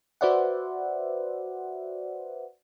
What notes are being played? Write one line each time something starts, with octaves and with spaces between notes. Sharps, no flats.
F#4 B4 C5 D5 E5 F#5